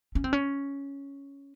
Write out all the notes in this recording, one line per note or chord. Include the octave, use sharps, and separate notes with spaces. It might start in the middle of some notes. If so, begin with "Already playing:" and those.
C#4
C4
C#4